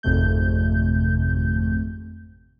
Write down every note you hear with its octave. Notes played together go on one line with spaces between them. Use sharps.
G#1 F2 C3 A3 G6